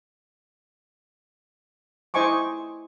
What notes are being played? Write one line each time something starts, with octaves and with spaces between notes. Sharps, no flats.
E4 C5 D#5 G#5 C#6 D6